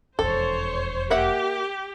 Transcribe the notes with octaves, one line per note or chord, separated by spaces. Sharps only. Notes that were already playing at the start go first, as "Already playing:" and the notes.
E1 F2 A4 C5 C#5
A#3 G4 E5 F#5